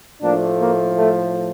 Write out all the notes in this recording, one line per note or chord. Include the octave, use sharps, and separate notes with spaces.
A2 F3 A3 A#3 D4
A#3
A3